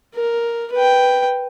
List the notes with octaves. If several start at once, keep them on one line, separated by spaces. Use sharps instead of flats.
A#4
B4 G5